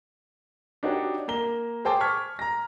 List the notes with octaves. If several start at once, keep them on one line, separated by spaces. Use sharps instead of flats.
D4 D#4 F#4 G4 C#5
A#3 A#5 G7
G#4 C5 G5 A5 D6
C#6 F6 G#6 B6
A#5 A#6